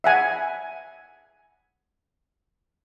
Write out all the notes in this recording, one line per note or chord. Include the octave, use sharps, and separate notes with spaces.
E5 F#5 G#5